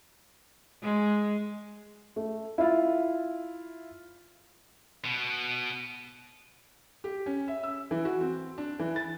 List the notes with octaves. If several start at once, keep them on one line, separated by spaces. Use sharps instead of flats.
G#3
A3
E4 F4
B2
G4
C#4
E5
E6
E3
F#4
C4
D4
E3
A6